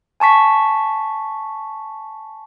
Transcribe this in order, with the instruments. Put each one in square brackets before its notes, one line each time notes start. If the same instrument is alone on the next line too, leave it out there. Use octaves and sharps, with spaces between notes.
[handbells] G#5 A5 C#6 B6